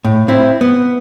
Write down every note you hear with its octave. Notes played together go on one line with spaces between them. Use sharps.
A2
C4 E4
B3